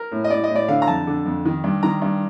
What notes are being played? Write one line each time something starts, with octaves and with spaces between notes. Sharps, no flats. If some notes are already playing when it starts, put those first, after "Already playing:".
Already playing: A#4
A2
D#5
A2 D5
D#5
A2
D5
D3 F5
A#5
F2 A5
D3
F2
D#3
G2
D#3 A#5
G2